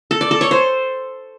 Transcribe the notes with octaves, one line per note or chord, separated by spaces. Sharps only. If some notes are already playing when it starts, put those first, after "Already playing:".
A4
D5
A4
C#5
C5